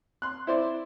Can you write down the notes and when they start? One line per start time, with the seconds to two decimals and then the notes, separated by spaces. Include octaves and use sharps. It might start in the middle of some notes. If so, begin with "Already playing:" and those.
0.22 C6 F#6
0.47 E4 C5 D5